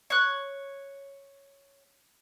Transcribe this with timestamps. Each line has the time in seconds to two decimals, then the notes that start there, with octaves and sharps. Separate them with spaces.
0.10 C#5 F#6